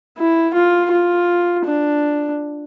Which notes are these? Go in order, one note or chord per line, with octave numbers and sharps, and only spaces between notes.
E4
F4
F4
D4